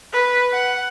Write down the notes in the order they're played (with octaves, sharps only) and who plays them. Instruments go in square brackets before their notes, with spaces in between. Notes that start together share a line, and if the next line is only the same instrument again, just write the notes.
[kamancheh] B4
F#5